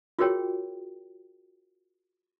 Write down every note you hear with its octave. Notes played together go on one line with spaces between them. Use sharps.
F4 F#4 G#4 A#4 C#5 G5